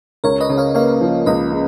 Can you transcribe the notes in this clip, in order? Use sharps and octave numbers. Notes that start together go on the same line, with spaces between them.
C#2 A#4 C#5
B4 D#5
C#3
C#5 F5
A#3 C#5 F5
F3
C#2 B4 D#5
C#3